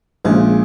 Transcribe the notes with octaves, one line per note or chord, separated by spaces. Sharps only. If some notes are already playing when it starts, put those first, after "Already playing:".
A#1 A#2 C#3 G#3